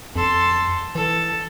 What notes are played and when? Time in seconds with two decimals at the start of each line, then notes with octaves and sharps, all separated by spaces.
0.16 F2 A4 C6
0.95 E3 A4